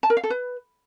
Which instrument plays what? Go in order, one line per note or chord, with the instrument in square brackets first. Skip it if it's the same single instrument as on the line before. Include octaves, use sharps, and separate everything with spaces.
[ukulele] A5
A#4
F5
A4
B4